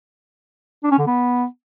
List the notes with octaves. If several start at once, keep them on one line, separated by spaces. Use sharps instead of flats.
D4
C#4
D3
B3